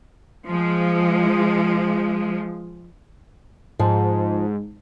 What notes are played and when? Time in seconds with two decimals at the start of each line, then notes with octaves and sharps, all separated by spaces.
0.47 F3 G#3
3.79 G#2 F3